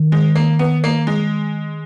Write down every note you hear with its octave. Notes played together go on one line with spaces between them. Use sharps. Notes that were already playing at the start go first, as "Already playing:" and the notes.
Already playing: D#3
G#3
A#3
B3
A#3
G#3